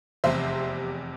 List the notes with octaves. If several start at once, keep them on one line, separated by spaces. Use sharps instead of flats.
F1 E2 C3 C5 E5